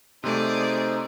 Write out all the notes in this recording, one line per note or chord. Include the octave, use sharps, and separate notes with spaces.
C3 A3 D#4 G#4 C5 D5